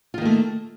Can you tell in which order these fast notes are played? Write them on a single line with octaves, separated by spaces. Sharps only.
F4 D#3 A#3 A3